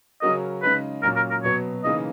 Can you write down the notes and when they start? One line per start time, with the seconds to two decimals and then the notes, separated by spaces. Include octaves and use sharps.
0.22 C#3 F#3 C#4 F#4 A#4 D#5
0.63 C#3 G#3 D#4 B4
1.03 A#2 F#3 A#3 C#4 A#4
1.16 A#4
1.31 A#4
1.44 B2 F#3 B3 C#5
1.84 C#3 E3 A#3 D#4 D#5